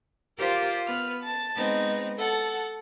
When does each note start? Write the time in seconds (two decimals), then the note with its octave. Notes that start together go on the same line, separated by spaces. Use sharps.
0.38 F4 G4 A#4 C5 D5
0.85 B3 B4 F6
1.23 A5
1.56 G#3 B3 C4 D#4
2.18 A4 F#5 A5